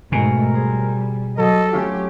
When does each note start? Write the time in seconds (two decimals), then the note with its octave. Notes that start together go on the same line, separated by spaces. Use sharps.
0.12 G#2 B2 A3 A#4 G#5 A#5
0.54 G3 G#4 C5
1.38 F#3 A4 D#5
1.73 A3 C#4 F4 G4